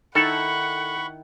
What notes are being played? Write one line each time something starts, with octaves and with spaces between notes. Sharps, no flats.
D#3 E4 A4 F#5 B5 C#6